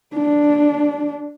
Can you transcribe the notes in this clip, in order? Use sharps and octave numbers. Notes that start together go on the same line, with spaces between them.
D4